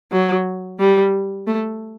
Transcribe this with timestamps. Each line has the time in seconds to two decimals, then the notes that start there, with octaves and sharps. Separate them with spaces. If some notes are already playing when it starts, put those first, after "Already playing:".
0.12 F#3
0.80 G3
1.47 A3